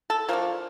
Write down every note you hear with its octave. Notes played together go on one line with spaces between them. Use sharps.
A4
F3 A3 D4 A#4